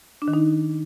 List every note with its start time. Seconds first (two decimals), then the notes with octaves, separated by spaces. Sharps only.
0.22 D4
0.28 D#3
0.34 D#4